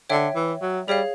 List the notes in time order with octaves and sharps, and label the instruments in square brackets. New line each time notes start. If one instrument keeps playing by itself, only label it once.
[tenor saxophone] D3 [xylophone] C#5 E5 G5
[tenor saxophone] E3
F#3
[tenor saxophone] G3 [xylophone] G#4 C#5 F5